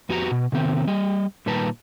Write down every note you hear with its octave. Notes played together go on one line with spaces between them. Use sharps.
F2 B3 F#4 G4 A5 A#5
B2
C3 D#3 B3 C4
G3 D#5
A#2 D#3 G3 B4 A5 A#5